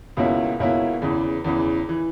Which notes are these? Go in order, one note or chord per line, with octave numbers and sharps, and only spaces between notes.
C#2 B2 A#3 C#4 E4
C#2 B2 A#3 C#4 E4
E2 C#3 E3
E2 C#3 E3
E3